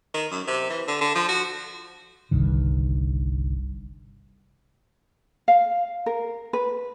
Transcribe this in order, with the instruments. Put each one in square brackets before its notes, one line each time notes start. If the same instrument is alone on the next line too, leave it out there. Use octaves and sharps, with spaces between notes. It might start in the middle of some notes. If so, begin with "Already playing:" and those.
[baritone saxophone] D#3
F#2
C3
E3
D3
D3
F3
F#4
[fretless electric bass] G1 C2 G2 D#3
[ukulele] F5
A#4
B4